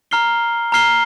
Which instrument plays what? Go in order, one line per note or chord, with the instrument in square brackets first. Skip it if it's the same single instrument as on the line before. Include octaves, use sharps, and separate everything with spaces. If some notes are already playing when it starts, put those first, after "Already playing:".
[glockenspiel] A#5 F6 C7 G7
A#5 F6 C7 G7